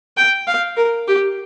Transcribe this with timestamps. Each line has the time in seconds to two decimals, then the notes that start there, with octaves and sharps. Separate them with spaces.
0.17 G5
0.47 F5
0.77 A#4
1.08 G4